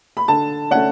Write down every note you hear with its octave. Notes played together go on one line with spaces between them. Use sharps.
B5
D3 A5
A3 C#4 F#5